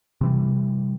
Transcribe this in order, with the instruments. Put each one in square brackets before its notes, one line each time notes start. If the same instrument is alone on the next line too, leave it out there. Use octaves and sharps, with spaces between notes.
[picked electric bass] C3 E3 G3